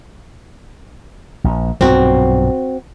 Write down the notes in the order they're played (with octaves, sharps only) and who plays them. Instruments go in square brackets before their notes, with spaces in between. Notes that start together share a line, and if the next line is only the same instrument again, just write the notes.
[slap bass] A#1
[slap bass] B1 G2 A#2 [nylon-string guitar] C4 F#4